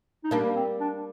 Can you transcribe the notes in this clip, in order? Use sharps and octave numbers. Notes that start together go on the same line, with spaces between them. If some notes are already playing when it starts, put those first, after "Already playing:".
D#4
G3 A#3 D4
C4
D4